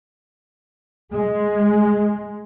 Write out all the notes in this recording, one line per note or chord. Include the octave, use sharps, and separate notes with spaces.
G#3